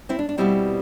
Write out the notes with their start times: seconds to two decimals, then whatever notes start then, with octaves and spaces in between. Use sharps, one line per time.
0.09 C4 E4
0.19 D4
0.29 D4
0.38 B2 G3 B3 C4 E4